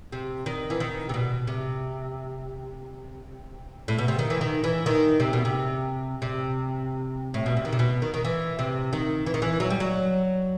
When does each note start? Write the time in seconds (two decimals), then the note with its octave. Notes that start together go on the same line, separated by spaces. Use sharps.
0.12 C3
0.46 D#3
0.70 E3
0.80 D#3
1.09 C3
1.14 B2
1.47 C3
3.88 A2
3.98 B2
4.08 C3
4.19 D#3
4.30 E3
4.41 D#3
4.64 E3
4.86 D#3
5.20 C3
5.33 B2
5.45 C3
6.22 C3
7.34 A2
7.46 B2
7.57 C3
7.65 D#3
7.73 C3
7.79 B2
8.02 D#3
8.14 D#3
8.25 E3
8.59 C3
8.93 D#3
9.26 E3
9.34 D#3
9.42 E3
9.60 F#3
9.70 G3
9.80 F#3